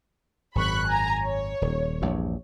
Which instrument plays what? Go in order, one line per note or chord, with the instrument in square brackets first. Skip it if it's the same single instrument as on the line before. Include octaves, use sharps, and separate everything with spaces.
[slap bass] G#1 F#2 [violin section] B5 C#6 F#6
[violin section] G#5 A#5
C#5
[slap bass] D#1
A#1 E2 G2